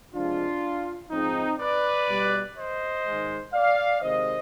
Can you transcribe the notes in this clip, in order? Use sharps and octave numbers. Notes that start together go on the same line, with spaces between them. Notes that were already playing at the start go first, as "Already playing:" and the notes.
C3 F3 G#3 D4 F4
G#2 F3 G#3 C4 D#4
B4 D5
B2 G3
C5 D#5
G#2 D#3 G#3
D5 F5
C3 D#3 G#3 C5 D#5